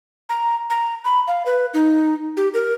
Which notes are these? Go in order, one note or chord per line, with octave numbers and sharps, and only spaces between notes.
A#5
A#5
B5
F5
B4
D#4
G4
A#4